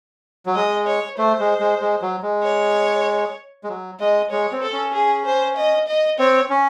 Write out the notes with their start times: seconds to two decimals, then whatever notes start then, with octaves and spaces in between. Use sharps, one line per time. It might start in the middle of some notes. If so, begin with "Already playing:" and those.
0.46 F#3
0.55 G#3 D#5
0.87 C#5
1.18 A3 C5
1.40 G#3
1.60 G#3
1.81 G#3
2.02 F#3
2.23 G#3
2.44 C#5
3.64 G#3
3.69 F#3
4.00 G#3 D#5
4.31 G#3 C#5
4.52 C4
4.62 A4
4.72 C#4
4.94 G#4
5.25 C5
5.57 D#5
5.88 D#5
6.19 C4 C#5
6.50 C#4